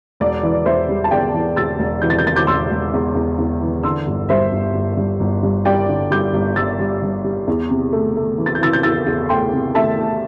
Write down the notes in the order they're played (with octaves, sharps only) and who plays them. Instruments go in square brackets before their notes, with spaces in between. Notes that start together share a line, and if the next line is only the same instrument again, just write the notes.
[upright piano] E1 D5
E3
E1 C5 E5
G3
A5
E2 D5 G5
E3
E1 E6 A6
E1
E3 G6
A6
G6
E1 A6
D6 G6
E1 C6 E6
E1
E2
E2
E2
E3
D3 C6 E6
G1
G2 C5 E5
G1
G1
G2
G1
G2
G3 D5 G5
D3
G3 D6 G6
G1
G3 E6 A6
G3
G2
G3
E2
C3
A3
A3
E3
A6
G6
E3 E6 A6
G6
E2 E6 A6
E2
A3 G5 C6
C3
A3 E5 A5
A3